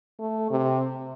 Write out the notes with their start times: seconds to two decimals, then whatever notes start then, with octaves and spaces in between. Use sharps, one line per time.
0.19 A3
0.51 C3